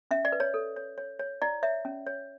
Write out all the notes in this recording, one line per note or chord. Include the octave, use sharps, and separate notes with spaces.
C#4 E5
D5
B4
C#5
A4
C#5
C#5
C#5
E4 D5
C#5 E5
C#4
C#5